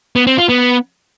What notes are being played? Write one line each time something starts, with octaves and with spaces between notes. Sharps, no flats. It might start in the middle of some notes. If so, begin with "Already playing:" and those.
B3
C4
F4
B3